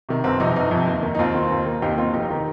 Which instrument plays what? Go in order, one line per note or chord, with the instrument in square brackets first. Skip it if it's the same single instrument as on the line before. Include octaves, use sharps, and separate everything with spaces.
[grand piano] C3 D#3
G1 C4
F2 C3 D#4
G1 D#4
F2 C3
D#2
D#3
D#4
D#2 C4 F4
D#3
D#2
D#3
D#2 D#4 G4
D#3 C4 F4
F1 D#4 G4
D#3